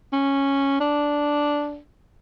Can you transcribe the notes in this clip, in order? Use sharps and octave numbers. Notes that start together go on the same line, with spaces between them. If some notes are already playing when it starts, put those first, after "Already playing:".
C#4
D4